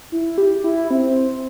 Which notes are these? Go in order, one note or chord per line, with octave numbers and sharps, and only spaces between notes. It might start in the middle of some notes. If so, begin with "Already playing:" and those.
E4
G4
E4
C4